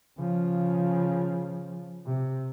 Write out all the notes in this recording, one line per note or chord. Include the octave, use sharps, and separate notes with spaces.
C#3 F3
C3